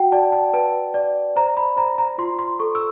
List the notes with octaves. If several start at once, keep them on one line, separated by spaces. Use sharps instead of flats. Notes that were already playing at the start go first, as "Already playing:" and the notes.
Already playing: F#4 F#5 G5
D5 A5
A5
B4 A5
D5
C5 A#5
B5
C5 A#5
A#5
F4 C6
C6
A4 C#6
E6